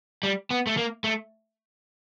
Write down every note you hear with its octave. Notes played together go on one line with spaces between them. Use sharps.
G3
B3
A3
A#3
A3